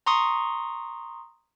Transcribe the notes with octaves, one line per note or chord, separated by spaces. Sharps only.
A#5 C6 C#6 D#6